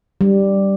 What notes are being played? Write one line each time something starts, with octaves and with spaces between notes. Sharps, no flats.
G3